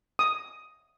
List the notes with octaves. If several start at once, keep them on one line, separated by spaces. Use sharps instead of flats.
D#6